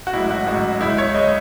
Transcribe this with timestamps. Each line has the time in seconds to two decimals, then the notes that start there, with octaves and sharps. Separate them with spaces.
0.07 F#4
0.13 A1 G#2 F#3 E4
0.31 F#4
0.47 A1 G#2 F#3 F#4
0.81 C#2 C#3 G#3 E4
0.98 C#5
1.15 C#3 G#3 D#5